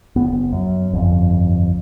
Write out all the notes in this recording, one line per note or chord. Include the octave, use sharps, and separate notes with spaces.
F#1 B3
F#2
G1 F2